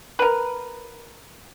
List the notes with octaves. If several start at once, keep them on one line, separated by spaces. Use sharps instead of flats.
A#4 B4